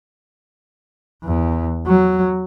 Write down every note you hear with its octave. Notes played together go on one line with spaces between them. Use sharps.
E2
F#3